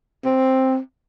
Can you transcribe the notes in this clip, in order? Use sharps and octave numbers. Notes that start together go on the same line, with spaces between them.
C4